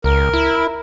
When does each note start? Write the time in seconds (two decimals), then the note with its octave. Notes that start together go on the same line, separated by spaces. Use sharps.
0.04 C#2 A#4
0.34 E4